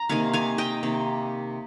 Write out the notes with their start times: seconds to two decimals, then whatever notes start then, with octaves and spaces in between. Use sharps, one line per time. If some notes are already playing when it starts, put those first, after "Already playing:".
Already playing: A#5
0.09 C3 D#3 A#3 F5 G#5
0.33 F5 G#5
0.58 D#5 G5
0.83 C3 D#3 A#3